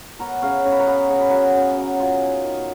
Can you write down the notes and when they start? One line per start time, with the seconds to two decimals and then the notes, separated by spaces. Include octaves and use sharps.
0.19 B3 A#4 C#5
0.42 C#3 C#5 F5
0.65 C#3 C#5
0.72 B4
0.79 A#4 C#5
0.87 B3 G#4 B4
1.09 C#3 A#4
1.20 B4
1.29 B3 F#4 A#4
1.55 C#3
1.77 F#3
2.00 F#3 F4 G#4
2.22 D#3
2.45 D#3